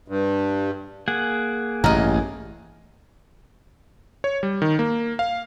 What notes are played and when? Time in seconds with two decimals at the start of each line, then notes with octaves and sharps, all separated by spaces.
0.08 G2
1.08 A#3 G#4 F#5
1.84 A1 G2 A#4 D#5
4.24 C#5
4.43 G3
4.62 D#3
4.79 A#3
5.19 F5